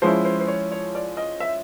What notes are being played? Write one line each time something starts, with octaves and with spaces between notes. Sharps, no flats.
F3 G#3 C#4 E4 C5
C5
C5
C#5
C#5
D5
D#5
E5